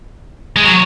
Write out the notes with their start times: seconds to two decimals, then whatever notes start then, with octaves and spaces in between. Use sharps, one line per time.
0.56 G#3
0.64 F#3